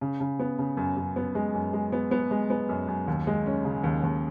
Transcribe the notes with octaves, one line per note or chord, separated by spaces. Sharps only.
C#3
C#3
B3
C#3
F#2
F#2
B3
G#3
F#2
G#3
B3
B3
G#3
B3
F#2
F#2
D#2
G#3
C#4
C#3
D#2
D#2